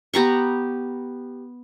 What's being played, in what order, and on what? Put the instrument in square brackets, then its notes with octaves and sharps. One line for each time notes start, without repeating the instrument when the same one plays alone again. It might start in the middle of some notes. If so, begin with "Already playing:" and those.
[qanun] B3 G4 A#5 C#6